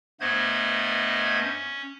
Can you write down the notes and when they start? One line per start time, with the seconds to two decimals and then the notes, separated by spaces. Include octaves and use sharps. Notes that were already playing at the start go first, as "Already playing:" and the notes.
0.20 G2 A3 B3 C5 D#5 G#6
1.41 C#4